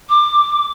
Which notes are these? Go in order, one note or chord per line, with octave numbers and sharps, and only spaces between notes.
D6